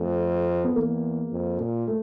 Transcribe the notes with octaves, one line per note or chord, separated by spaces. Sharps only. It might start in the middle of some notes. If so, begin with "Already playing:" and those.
Already playing: F2 A3
B3
E2 A#3
F2
A#2
A3